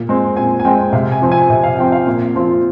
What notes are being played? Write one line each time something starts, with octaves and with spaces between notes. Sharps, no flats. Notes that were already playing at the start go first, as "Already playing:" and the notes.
Already playing: A#2
G#3 C4
A#2 G#5
G#5
G#3 C4 G5
C3 F5
G#5
F3 C4
G#5
C3 G#5
F5
F3 C4 G5
F5
A#2
F3 C4 F4